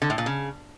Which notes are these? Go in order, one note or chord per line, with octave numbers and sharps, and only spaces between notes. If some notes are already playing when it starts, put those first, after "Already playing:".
D3
A2
A#2
C#3